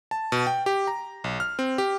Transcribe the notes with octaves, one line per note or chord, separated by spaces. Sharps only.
A5
B2
G5
G4
A#5
B1
F6
C4
G4